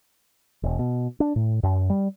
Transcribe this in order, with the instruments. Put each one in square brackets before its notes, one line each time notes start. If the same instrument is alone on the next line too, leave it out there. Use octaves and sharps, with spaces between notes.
[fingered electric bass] E1
B2
D4
A2
F#2
G3